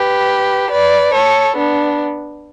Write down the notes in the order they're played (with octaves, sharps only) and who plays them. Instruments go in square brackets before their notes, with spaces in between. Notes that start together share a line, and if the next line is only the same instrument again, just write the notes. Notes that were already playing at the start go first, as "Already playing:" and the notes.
Already playing: [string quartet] G4 B4
B4 D5
A4 C#5
B3 D4